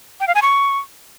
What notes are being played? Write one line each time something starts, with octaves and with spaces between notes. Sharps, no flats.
G5
F5
G#5
C#6